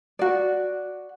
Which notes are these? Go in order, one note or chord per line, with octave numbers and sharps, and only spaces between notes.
F#4 D5